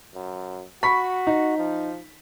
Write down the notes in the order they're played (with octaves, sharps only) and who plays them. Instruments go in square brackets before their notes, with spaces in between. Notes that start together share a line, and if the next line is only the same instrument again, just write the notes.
[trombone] F#2
[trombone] F#4 [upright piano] B5 C#6 B6
[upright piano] D#4
[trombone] F3